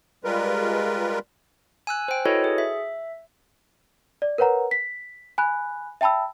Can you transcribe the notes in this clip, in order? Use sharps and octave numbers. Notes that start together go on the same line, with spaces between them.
G3 G#3 F4 A#4 B4
G#5 E6 F#6
C5 G5
E4 F#4 A4 B4 C#5 D#5
G#4
E5
D5
A#4 B4 C#5 F#5 A#5
B6
G#5 B5 F#6
E5 G5 A5 B5 E6